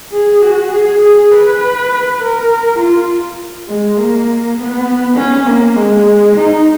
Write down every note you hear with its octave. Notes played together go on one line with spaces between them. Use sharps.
G#4
F#4
G#4
G#4
B4
A#4
F4
G#3
A#3
B3
C#4
A#3
G#3
D#4